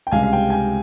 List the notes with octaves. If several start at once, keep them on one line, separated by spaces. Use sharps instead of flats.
G5
C#2 C3 G3 F5 G#5
F5
G5
G#5
G5